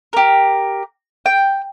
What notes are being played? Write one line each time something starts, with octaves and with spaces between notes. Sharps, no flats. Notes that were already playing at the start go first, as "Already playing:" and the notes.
G4 A#4
G5